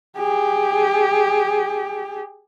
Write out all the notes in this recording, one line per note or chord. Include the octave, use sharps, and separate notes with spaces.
G4 G#4